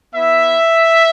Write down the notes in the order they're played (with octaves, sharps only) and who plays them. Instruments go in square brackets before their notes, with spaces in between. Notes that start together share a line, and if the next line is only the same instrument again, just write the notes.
[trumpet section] B3 E4 E5